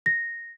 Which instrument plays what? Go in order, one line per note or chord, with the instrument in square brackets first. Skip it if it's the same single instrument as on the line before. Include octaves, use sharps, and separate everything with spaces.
[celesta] A#6